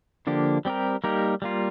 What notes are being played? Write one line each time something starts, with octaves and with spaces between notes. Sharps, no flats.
D3 F3 A#3 D4 G4
G3 C4 G4 A#4
G3 A#3 D#4 G4 A#4
G3 A#3 F4